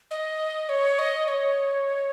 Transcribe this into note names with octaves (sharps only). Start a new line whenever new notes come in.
D#5
C#5
D#5
C#5